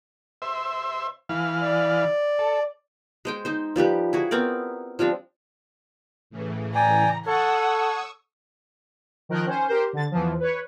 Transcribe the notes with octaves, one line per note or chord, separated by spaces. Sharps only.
C5 E5
E3 F5
D5
A4
G#3 C5 G5
D#4 C5
F3 G3 G4 B4
E4 F#4 G#4
B3 C4 A#4 D5
F3 G3 C4 D4
A2 C#3 E3
D5 G5 G#5 A#5
A4 C#5 F#5 C#6 D#6 E6
D#3 F3 A#4 G5 F#6
C#4 C5
G4 A#4 C5
D3 A6
E2 E3 F3
B4 C#5